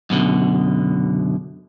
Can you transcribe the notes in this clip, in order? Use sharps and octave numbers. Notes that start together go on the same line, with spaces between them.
F#2 B2 D3